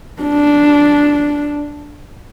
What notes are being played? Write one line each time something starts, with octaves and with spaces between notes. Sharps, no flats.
D4